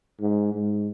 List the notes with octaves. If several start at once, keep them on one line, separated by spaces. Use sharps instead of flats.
G#2
G#2